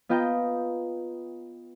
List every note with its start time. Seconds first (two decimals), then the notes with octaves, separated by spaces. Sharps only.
0.09 B3 F4 D#5 G5 A#5